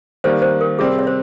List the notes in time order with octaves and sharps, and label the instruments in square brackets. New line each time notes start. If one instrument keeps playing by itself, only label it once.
[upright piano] D#3 G3 A#3 [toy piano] C5
[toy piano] C5
A#4
[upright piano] C3 G3 C4 [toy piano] G#4
[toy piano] C#5
C5